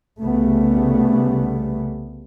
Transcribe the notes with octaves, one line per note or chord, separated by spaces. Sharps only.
C2 C#3 G3 A3 B3